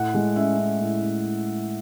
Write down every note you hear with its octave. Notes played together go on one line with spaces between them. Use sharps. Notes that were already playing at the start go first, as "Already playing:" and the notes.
Already playing: A2 F#5
G#3
C#4 E5
C#4
A2
A2